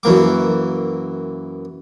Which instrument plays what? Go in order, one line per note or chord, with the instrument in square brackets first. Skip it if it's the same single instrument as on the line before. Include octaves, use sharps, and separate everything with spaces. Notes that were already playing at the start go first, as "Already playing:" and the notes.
[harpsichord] F#2 E3 A#3 D6